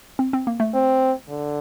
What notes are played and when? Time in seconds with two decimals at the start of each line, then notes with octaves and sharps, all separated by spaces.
0.19 C4
0.33 C4
0.47 A#3
0.60 A3
0.74 C4
1.29 D3